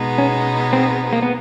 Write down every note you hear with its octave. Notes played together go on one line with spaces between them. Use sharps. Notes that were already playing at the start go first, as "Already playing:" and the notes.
Already playing: B2 G#3 B3 D#4
C#4
C4
A#3
B3